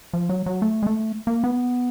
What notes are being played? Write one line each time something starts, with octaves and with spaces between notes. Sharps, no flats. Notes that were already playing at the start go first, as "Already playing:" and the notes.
F3
F#3
F#3
A3
G#3
A3
A#3
B3